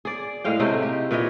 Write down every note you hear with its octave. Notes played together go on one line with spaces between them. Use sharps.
G#4 D5
A2 G#3 F5 G5
C3 G#3 A3 D#4
G4
A#2 E3 C#5 D#5